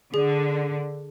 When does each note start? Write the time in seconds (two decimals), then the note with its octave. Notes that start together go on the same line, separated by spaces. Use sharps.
0.14 D3 G#4